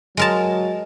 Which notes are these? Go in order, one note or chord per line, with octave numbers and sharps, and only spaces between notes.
F#3 G#3 A#4 A5